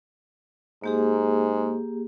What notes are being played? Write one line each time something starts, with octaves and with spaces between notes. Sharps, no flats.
G#2 A#3 G4 G#4